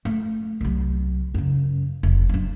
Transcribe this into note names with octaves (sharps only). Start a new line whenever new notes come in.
A3
C2 F#3
F#2 C#3
F1
F#3 D4